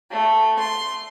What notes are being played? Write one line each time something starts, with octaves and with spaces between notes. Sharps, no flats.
A3
C6